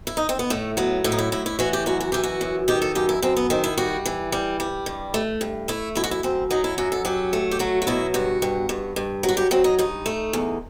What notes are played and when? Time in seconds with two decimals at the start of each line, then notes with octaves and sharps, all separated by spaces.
0.07 E4
0.17 D#4
0.29 C4
0.39 B3
0.50 A2 A3
0.77 F#3 B3
1.04 A2 E4
1.12 D#4
1.18 E4
1.32 A2 E4
1.46 E4
1.59 E3 F#4
1.73 G4
1.86 F#2 F#4
2.00 F#4
2.12 E3 G4
2.23 F#4
2.41 F#2
2.68 D#3 G4
2.82 A4
2.95 F#2 G4
3.09 E4
3.22 F#2 C4
3.36 B3
3.50 D#3 C4
3.64 E4
3.78 G3 F#4
4.06 E3
4.32 G3
4.60 G3
4.86 G2
5.14 A3
5.41 G2
5.68 A3 E4
5.95 F#2 E4
6.04 F#4
6.11 E4
6.23 F#2 C4
6.50 F#3 D#4
6.64 E4
6.78 F#2 F#4
6.92 A4
7.05 F#3 G4
7.33 A3
7.51 G4
7.59 F#3 F#4
7.82 F#4
7.87 B2 E4
8.14 G2 F#4
8.42 G2
8.69 G2
8.96 G2
9.23 F#3
9.29 F#4
9.37 G4
9.51 F#3 C4
9.64 D#4
9.79 G2 D#4
10.06 A3
10.33 E2